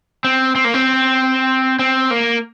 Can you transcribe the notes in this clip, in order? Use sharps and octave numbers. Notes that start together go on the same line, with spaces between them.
C4
C4
A#3
C4
C4
A#3